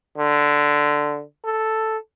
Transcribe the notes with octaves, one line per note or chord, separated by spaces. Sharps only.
D3
A4